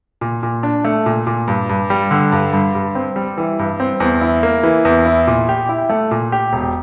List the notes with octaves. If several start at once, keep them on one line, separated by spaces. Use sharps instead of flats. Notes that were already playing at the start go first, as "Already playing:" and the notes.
A#2
A#2
D4
A3
A#2
A#2
G2
G2
G3
D3
G2
G2
G2
C4
G3
E3
G2
C4
E2
E4
A#3
E3
E2
E4
A#2
G4
E4
A3
A#2
G4
E1